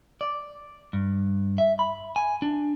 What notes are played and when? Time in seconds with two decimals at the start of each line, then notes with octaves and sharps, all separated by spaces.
0.21 D5
0.93 G2
1.58 E5
1.79 B5
2.16 G#5
2.42 D4